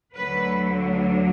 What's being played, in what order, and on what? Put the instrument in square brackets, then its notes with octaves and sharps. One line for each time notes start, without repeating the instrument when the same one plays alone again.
[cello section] D2 D3 F#3 A3 B4